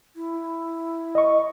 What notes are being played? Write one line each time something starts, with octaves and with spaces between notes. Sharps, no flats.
E4
D#5 C#6